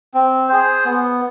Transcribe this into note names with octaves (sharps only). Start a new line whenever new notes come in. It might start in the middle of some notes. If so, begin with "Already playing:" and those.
C4
G#4 C5
B3